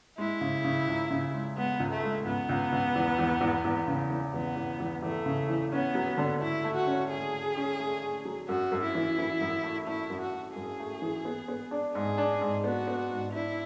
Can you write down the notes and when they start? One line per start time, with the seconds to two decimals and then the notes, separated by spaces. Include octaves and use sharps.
0.18 G#3 E4
0.41 C#3
0.64 C#3
0.88 C#2
1.11 C#3
1.34 G#3
1.57 G#3 B3
1.80 C#2
1.91 A3
2.03 G#3
2.26 C#2 B3
2.49 C#2
2.72 C#2
2.95 E2
3.19 E2
3.41 E2
3.65 E2
3.88 C#3
4.10 E3
4.33 E2 B3
4.56 E2
4.80 E2
5.02 E2 A3
5.26 C#3
5.49 E3
5.72 B3 C#4
5.95 F#3
6.18 D3
6.41 A3 E4
6.64 A3
6.76 F#4
6.87 C#4
7.10 A3 G#4
7.33 A3
7.57 C#4
7.80 A3
8.02 A3
8.25 F#3
8.49 F#2 F#4
8.72 F#2
8.83 E4
8.95 E3
9.19 E3
9.41 F#2
9.64 A3
9.87 A3 E4
10.10 F#2
10.21 F#4
10.33 A3
10.56 F#2 G#4
10.80 A3
11.02 E3
11.25 B3
11.48 B3
11.71 D4
11.94 G#2 G#4
12.18 D4
12.41 G#2
12.64 B3 F#4
12.87 B3
13.10 G#2
13.33 D4 E4